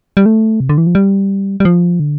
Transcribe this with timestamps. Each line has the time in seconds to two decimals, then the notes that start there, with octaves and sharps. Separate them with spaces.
0.17 G3
0.26 A3
0.60 C3
0.69 D3
0.78 E3
0.87 F3
0.95 G3
1.60 G3
1.65 F3
2.00 D3